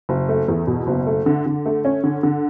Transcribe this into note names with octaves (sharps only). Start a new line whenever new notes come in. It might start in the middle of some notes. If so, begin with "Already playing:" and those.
F#1
A3
E2
B2
F#1
A3
D3
D3
A3
C#4
D3
D3